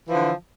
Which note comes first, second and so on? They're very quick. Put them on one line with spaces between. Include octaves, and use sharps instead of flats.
E3 F3 D3